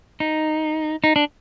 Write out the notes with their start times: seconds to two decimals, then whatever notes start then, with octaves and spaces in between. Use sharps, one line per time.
0.20 D#4
1.04 D#4
1.16 D4